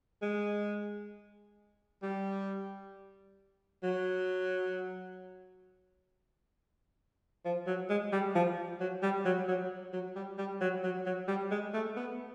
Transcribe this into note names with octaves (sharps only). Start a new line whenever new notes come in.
G#3
G3
F#3
F3
F#3
G#3
G3
F3
F#3
G3
F#3
F#3
F#3
G3
G3
F#3
F#3
F#3
G3
G#3
A3
B3